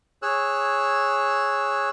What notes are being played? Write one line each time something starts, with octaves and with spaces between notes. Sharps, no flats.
G#4 C#5 E6 F#6